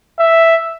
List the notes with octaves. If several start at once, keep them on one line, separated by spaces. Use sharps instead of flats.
E5